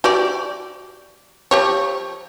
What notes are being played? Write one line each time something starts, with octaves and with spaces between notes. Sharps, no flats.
F#4 G4 D5
F3 G4 C#5